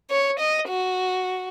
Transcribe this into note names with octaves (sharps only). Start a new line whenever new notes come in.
C#5
D#5
F#4